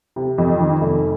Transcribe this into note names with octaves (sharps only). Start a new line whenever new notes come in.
C3
F2
D#3
F1